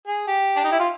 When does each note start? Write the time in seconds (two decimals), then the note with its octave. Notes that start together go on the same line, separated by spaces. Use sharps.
0.07 G#4
0.27 G4
0.56 D4
0.64 D#4
0.71 E4
0.80 F4